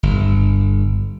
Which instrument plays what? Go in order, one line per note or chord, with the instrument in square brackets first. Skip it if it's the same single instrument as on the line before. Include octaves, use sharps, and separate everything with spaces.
[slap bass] G1